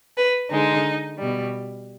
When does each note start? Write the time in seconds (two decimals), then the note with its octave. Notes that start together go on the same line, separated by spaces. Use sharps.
0.16 B4
0.51 D3 G#3 D#4
1.18 B2 G3